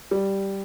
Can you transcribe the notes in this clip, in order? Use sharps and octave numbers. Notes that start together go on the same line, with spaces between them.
G3